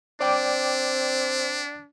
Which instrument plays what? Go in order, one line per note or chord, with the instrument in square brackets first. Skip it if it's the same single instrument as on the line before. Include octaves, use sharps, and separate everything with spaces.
[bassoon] C4 [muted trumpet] D4 [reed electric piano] D5 G5 D6